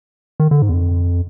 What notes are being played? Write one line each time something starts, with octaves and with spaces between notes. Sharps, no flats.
D#3
D3
G#2
E2
F2